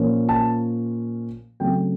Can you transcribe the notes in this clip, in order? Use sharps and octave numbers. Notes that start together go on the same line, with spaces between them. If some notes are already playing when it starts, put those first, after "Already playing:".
Already playing: A#2 F3 A#3 C#4
A5
C#3 F#3 A3 C4 G5